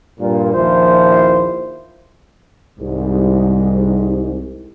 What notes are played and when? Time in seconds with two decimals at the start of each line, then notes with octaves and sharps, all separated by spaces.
0.20 G2 A#2
0.54 A#1 D#2 F3 E4 C5
2.80 C2 G#2